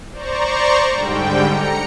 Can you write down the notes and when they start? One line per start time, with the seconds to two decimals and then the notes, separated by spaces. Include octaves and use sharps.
0.11 C5 D5 A#5 C#6
0.93 G#2 D3 G3 G5
1.46 A#5 C#7